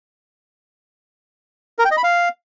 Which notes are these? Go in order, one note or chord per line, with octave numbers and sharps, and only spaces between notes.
A#4
G5
D#5
B5
F5